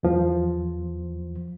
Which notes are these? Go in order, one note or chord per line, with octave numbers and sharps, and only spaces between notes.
E2 F3